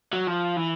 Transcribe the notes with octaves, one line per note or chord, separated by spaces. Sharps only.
F#3
F3
E3